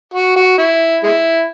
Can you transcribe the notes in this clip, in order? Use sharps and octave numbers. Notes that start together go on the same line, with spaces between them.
F#4
F#4
E4
G#3 E4